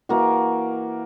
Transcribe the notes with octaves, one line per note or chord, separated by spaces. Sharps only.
E3 A#3 F#4